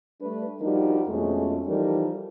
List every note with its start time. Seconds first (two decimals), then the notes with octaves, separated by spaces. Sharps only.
0.20 G3 A3 D4 B4
0.60 F3 G3 D4 D#4 F#4 A#4
1.08 F2 B2 G#3 A3 C#4
1.66 E3 F3 G3 D#4 A4 A#4